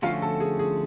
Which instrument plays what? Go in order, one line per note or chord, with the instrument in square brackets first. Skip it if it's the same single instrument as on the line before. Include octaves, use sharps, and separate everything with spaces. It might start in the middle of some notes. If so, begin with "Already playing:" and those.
[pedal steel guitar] D3 F3 A3 C#4 F#4 [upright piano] F4 F5
[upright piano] A4
G#4
G#4